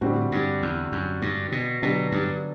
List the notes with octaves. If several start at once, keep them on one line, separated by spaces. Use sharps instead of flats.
A2 D3 G3 C4 F#4
G2
E2
F#2
G2
B2
B2 D3 F#3 B3 D4 G4
G2